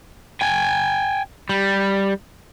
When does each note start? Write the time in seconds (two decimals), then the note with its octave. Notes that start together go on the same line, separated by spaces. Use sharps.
0.41 G5 G#5
1.49 G3